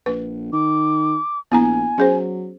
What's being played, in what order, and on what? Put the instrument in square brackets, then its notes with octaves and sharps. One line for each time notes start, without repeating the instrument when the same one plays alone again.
[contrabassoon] A#1 [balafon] B4
[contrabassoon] D#3 [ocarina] D6
[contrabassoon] A#1 [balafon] B3 E4 A#5 [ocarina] G#5
[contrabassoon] F#3 [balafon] C#4 G#4 C5